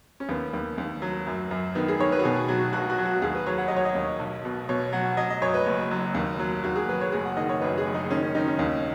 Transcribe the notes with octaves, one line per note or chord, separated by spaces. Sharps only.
C#4
D#2 B3
D#2
D#2
F#3
F#2
F#2
D#3 B3
G#4
D#3 C#5
B4
F#4
B2 G#4
F#3 F#4
B1 F#4
F#4
F#3
F#4
D#2 G#4
B4
F#3 C#5
F#5
F#3 D#5
C#5
D#5
D#2
B1
B2
B2 C#5
F#3 F#5
F#3 D#5
D#5
F#2 C#5
B4
F#1
F#3
D#2
F#3
D#2 F#4
G#4
F#3 B4
C#5
F#1 G#4
F#5
D#3 D#5
C#5
F#2 B4
G#4
F#1
D#4
D#3 C#4
C#4
D#3 D#4
C#4
D#2